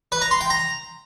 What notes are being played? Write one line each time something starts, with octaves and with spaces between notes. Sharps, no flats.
B4
A#5
C6
G5
A#5